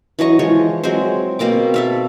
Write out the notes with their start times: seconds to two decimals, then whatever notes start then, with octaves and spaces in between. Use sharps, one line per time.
0.19 E3 F#3 D#5 C#6
0.39 E3 F3 G#3 C#5
0.84 F#3 G#3 C4 C5
1.39 B2 A#3 C4 D6
1.74 A4 E5 F5